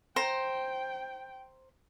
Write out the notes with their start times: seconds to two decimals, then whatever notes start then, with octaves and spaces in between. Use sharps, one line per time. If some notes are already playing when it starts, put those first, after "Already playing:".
0.16 C5 G5 A#5